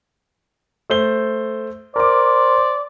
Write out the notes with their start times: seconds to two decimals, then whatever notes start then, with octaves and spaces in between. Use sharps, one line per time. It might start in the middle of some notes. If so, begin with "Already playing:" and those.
0.90 A3 C5 G7
1.96 A#4 C5 D5 D6